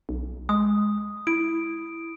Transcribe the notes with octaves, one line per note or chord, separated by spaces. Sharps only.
B1
G#3 D#6
E4 D7